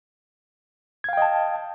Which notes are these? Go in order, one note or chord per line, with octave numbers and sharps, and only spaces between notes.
D#5 F5 G5 A5 G#6